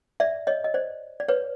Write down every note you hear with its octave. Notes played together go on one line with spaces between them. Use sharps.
D5 E5
C#5 D#5
D#5
C5 D5
D5
B4 C#5